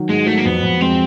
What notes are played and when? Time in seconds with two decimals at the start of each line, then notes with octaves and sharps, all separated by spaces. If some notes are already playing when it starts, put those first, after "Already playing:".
Already playing: D#3 F#3
0.09 G#2 G#3
0.26 F#3 A3
0.37 A#3
0.45 F2 B3
0.63 F2
0.81 G#3 C4